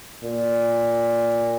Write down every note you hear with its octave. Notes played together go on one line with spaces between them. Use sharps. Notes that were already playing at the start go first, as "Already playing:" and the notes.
A#2